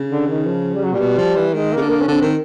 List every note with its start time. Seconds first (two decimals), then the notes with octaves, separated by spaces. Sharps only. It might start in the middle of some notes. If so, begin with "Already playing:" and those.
Already playing: C#3
0.10 D3
0.28 D#3
0.46 F3
0.73 G3
0.83 F#3
0.93 A#2 G3
1.00 B2
1.18 F3
1.36 E3
1.54 D#3 G#3
1.73 C#3 A#3
1.81 D3
1.90 A#3
2.01 C#4
2.08 D3 C4
2.22 D#3